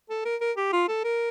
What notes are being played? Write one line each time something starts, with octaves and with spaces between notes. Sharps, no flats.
A4
A#4
A#4
G4
F4
A4
A#4